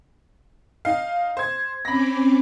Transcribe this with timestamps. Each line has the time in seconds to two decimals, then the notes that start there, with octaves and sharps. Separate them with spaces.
0.85 D#4 F5
1.37 C5 G#6
1.85 C4 C#4 B5 D6 A#6